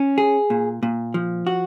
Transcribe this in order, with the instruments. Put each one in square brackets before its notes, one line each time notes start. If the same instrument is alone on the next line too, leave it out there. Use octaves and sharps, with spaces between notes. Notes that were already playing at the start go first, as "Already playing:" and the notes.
Already playing: [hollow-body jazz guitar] C#4
G#4
A#2
A#2
F3
F#4